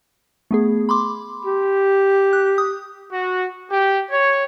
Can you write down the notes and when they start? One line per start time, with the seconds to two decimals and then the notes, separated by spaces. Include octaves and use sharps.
0.51 A3 B3 G#4
0.89 B5 C6 D6
1.45 G4
2.33 F#6
2.58 D#6
3.11 F#4
3.70 G4
4.10 C#5